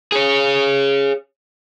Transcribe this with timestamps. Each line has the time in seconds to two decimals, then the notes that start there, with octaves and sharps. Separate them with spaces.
0.12 G#4 C#5